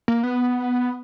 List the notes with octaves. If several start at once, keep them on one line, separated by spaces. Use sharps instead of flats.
A#3
B3